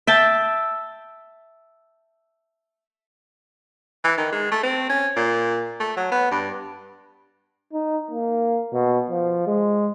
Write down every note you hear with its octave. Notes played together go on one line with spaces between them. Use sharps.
E5 G5 A5
E3
D#3
G#3
A3
C4
C#4
A#2
A3
F#3
B3
G2
D#4
A#3
B2
F3
G#3